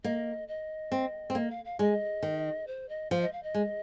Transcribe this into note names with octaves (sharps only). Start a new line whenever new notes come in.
A#3 D#5
D#5
C4
C4
A#3 D#5
F5
F5
G#3 D#5
D#3
C5
D#5
F3 F5
D#5
F5
D#5
G#3